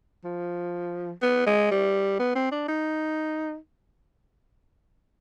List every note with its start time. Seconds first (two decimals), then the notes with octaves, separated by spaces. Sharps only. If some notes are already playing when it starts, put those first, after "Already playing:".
0.25 F3
1.22 B3
1.46 G#3
1.71 G3
2.20 B3
2.35 C4
2.52 D4
2.68 D#4